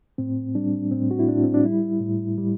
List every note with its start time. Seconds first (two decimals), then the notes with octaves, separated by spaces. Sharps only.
0.18 A2 C4
0.55 G3 D4
0.91 A2 C4
1.11 F#4
1.19 E4
1.28 A2 D4
1.43 C4
1.54 D4
1.65 G3 E4
2.01 A2
2.37 G3